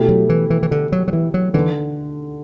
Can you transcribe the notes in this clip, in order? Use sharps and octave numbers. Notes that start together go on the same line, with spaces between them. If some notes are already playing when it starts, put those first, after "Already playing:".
Already playing: B2 A3 E4 G4
F#3
E3
E3
E3
D3
F#3
F#3
E3
F#3
D3 E3